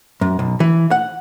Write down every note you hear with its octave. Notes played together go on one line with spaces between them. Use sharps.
F#2
B1
E3
F#5